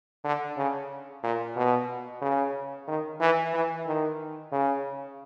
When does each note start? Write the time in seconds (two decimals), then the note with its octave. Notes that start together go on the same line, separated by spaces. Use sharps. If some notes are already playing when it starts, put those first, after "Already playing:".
0.25 D3
0.57 C#3
1.24 A#2
1.56 B2
2.22 C#3
2.88 D#3
3.21 E3
3.54 E3
3.86 D#3
4.52 C#3